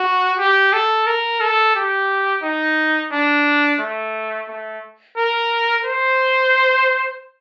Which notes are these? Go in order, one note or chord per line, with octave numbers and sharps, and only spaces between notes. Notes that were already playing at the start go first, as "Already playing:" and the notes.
Already playing: F#4
G4
A4
A#4
A4
G4
D#4
D4
A3
A3
A#4
C5